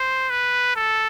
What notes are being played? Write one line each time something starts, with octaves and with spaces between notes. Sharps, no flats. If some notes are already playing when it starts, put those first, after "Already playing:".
Already playing: C5
B4
A4